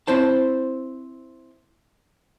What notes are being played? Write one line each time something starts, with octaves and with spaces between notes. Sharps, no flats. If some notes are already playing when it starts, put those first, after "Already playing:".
C4 E4 C5 A5